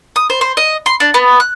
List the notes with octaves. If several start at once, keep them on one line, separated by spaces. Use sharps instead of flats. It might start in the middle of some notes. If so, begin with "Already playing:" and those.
D#6
C5
C5
D#5
C6
D4
B3
F#6